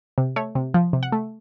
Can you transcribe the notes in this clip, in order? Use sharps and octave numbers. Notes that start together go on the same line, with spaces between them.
C3
A3 C#5
C3
F3
C3
F#5
A3